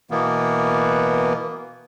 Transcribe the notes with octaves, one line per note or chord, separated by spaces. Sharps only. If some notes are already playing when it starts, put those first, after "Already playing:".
B2 E3 A#3 B3